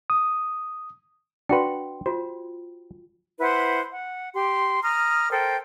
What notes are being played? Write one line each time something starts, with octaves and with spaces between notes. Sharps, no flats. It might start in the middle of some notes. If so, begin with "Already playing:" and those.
D#6
D4 F#4 B4 G5 C6
F4 F#4 C5
E4 B4 C5 F#5
F#5
G4 C6
A#5 D#6 F6
A4 A#4 C5 G5